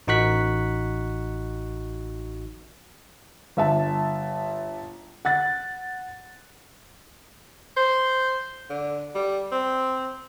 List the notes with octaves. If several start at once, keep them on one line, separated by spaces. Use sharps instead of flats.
A1 D#4 F#4 C#6 F#6 B6
G1 E5 A5
F#5 F#6 A6
C5
D3
G3
C4